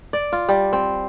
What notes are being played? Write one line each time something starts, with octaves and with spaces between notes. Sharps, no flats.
D5
F4
G3
C4